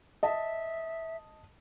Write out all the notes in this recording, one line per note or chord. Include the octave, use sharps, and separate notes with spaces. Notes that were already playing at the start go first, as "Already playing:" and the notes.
D#5 E5 A5